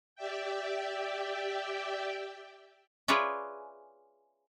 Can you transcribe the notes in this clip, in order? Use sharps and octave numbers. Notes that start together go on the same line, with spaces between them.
G4 D5 E5 G5
F4 G#4 B4 C#5 D5 E5